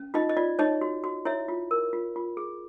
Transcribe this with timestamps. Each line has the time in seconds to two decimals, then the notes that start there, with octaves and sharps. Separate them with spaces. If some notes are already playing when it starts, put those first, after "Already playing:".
Already playing: C#4
0.14 D#4 F4 D#5
0.29 D#5
0.37 F4 D5
0.59 D#4 C#5 D#5
0.81 F#4
1.04 F#4
1.25 E4 C#5 E5
1.48 F4
1.71 A#4
1.93 F4
2.16 F4
2.37 G#4